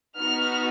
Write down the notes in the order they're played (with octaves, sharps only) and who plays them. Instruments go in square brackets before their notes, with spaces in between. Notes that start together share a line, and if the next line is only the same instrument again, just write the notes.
[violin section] B3 D#4 F#4 F6